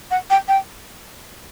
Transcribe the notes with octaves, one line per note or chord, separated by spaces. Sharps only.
F#5
G5
G5